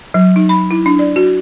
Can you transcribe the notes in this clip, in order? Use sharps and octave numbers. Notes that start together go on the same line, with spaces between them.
F#3
D#4
B5
E4
D4
D5
F#4